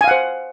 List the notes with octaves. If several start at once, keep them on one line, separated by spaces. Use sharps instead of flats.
C5 F5 F#5 G#5